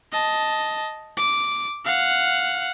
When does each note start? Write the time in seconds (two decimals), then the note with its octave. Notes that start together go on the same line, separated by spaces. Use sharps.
0.12 D#5 A5
1.17 D6
1.85 F5 F#5